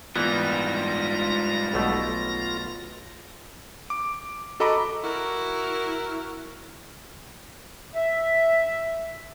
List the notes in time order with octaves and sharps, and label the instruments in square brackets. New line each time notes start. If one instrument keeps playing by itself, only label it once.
[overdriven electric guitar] G#2 G3 [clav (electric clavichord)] E3 A#3 B3 [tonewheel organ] F4 A#6
[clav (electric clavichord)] B1 B2 A3
[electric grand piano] D6
F#4 A4 D#5 A#5 B5 D6
[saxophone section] E4 F#4 A#4
[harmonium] E5